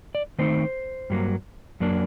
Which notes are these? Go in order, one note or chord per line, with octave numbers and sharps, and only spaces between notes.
D5
D#3 A3 C4 D#4 C5
G2 F#3 A#3
F#2 F#3 A#3 D4